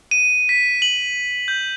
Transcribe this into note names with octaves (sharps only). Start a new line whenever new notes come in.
D#7
B6
F#7
G6